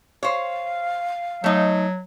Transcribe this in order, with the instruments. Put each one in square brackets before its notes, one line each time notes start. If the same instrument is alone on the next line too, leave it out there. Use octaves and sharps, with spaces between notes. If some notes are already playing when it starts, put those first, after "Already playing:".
[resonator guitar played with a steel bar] C5 C#5 [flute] F5
[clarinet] F#3 [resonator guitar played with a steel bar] A3 D#4